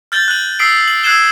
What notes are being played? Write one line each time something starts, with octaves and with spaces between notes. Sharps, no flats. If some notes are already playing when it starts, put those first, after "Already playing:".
F6 G6 A6 F#7 G7
F#6 F#7
D#6 E6 B6 C7 D7
F#7
E6 F#6 G#6 C7 E7 G7